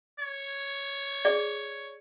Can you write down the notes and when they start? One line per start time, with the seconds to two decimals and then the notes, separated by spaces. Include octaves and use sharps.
0.19 C#5
1.25 G#4 D5